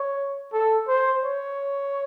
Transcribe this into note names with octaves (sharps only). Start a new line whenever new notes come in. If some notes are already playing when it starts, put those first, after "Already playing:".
Already playing: C#5
A4
C5
C#5